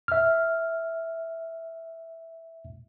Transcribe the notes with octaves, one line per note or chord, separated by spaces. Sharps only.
E5 F6